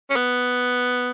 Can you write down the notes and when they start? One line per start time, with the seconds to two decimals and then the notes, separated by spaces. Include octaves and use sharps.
0.10 C#4
0.16 B3